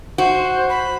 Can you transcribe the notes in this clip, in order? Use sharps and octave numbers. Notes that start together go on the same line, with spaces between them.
F#4 C5
B5